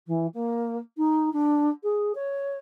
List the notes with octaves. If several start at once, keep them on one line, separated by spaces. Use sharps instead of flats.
E3
A#3
D#4
D4
G#4
C#5